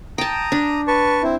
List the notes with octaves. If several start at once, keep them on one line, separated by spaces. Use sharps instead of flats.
G5 A5 A#5 D#6
D4
B4 A5 C#6
C4 E4